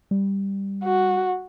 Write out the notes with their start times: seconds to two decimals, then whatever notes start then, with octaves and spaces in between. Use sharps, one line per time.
0.11 G3
0.83 F#4